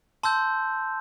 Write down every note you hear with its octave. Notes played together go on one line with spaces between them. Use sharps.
A5 C6 E6 G6